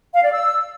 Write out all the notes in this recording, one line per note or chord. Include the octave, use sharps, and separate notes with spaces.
F5
D5
E6